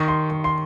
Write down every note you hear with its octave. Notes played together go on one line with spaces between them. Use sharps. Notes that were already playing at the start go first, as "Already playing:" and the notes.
Already playing: D#3 C#6
C6
D#3
C6